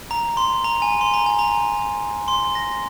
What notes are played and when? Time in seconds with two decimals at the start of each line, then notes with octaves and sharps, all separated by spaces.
0.11 A#5
0.37 C6
0.64 A#5
0.82 G#5
1.01 C6
1.14 A#5
1.26 G#5
1.39 A#5
2.28 C6
2.55 A#6